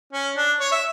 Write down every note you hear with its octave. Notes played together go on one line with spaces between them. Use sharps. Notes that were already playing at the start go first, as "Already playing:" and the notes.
C#4
D4
C#5
E5